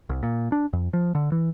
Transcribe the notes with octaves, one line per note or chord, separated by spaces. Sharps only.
C2
A#2
D4
F2
F3
D3
E3